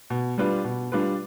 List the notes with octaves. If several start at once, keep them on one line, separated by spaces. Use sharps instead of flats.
B2
G3 D4 F4 B4
B2
G3 D4 F4 B4